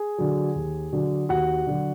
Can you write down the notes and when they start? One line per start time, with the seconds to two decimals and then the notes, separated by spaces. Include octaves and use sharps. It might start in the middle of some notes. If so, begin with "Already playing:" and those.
Already playing: G#4 G#5
0.18 D3 F#3
0.55 D#2
0.93 D3 F#3
1.29 D#2 F#4 F#5
1.67 D3 F#3